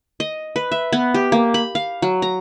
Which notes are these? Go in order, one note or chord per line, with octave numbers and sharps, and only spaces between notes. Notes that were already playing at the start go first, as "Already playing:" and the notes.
D#5
B4
E5
B3
G4
A#3
B5
F5
F#3
A#5